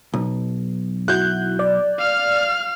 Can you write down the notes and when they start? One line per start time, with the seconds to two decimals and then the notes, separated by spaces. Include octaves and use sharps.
0.14 B1
1.08 E4 F#4 F#6 G6
1.59 D5
1.98 F5 F6